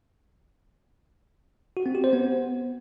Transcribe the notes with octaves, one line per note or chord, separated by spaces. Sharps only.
F#4
C4
G4
C5
B3